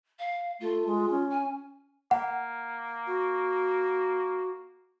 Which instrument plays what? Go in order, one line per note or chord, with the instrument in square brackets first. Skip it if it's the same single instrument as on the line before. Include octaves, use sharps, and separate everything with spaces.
[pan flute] F5
[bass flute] A3 [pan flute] F4
[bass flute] G#3
C#4
[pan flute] G#5
[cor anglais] A#3 [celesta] F#5
[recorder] F#4